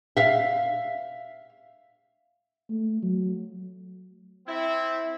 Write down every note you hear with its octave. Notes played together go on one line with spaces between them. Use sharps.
E5 F5
A3
F#3
C4 E4